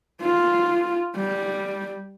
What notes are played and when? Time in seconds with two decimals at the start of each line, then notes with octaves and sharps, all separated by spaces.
0.22 F4
1.16 G3